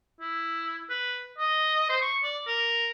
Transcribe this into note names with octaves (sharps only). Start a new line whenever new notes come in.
E4
B4
D#5
C5
C#6
D5
A#4